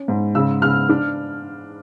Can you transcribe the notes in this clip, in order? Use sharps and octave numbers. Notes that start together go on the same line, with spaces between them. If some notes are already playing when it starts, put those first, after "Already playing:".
Already playing: C#4
G#2
C#3 E6
C#3 F6
D4